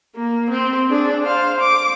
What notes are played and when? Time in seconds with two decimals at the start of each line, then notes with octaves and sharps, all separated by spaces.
0.15 A#3
0.50 C4
0.90 D4 G#4
1.23 C5 F5
1.60 D6